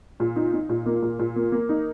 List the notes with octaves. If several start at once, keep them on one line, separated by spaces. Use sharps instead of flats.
A#2
D#4
D#4
A#2
A#3
A#2
A#2
A#3
A#3
D#4